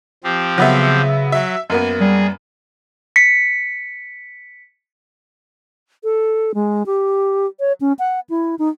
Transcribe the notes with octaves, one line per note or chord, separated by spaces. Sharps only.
F3 C4 G4
C#3 F#3 B3 E5
F#3 E5
F#2 A#3 B3 G#5
G3 G#4
B6 C#7
A4
G#3
G4
C#5
C#4
F#5
E4
D#4